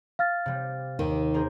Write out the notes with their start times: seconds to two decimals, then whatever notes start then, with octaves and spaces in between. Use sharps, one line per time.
0.19 F5 F6 A6
0.46 C3 G3
0.99 D#2 D#3
1.34 G#4 A#4 C5